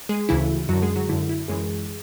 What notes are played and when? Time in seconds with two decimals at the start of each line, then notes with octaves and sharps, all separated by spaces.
0.09 G#3 G#4
0.29 D2 C#3 E3 E4
0.69 F#2 D3 F#3 F#4
0.82 G#3 G#4
0.96 F#3 F#4
1.09 F#2 D3 E4
1.29 E4
1.48 F#2 E3 G#3 G#4